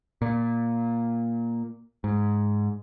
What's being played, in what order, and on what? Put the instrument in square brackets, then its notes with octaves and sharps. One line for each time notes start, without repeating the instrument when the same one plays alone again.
[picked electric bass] A#2
G#2